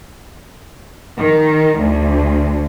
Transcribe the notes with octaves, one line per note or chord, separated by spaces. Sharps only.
D#3
D2